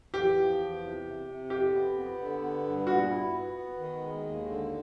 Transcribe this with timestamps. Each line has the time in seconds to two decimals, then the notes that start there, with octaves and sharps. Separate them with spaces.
0.13 E2 G4
0.36 F3
0.59 E2
0.81 C3
1.04 C3
1.27 C3
1.50 F2 G4
1.73 B3
1.95 B3
2.19 D3
2.41 B3
2.64 G2
2.86 A#2 F#4
3.09 E4
3.32 B3
3.55 B3
3.78 D#3
4.00 G#3
4.23 D#2
4.46 D3